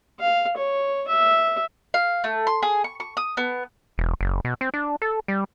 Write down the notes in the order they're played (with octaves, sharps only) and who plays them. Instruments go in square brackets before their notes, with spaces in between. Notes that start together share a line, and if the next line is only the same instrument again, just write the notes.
[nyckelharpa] F5
C#5
E5
[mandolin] F5
A3
C6
G#4
C#6
C#6
D#6
B3
[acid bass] E1
F#1
B2
C4
D4
A4
G3